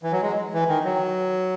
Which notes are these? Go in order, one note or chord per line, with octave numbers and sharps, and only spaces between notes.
E3
F#3
G#3
E3
D#3
F#3